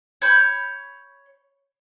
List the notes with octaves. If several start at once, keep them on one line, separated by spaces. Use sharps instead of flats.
C#5 B5 G6